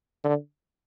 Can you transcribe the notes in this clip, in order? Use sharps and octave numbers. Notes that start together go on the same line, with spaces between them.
D3